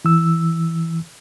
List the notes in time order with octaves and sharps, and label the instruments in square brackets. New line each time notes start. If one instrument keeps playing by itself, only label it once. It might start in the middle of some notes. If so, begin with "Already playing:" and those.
[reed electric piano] E3 E6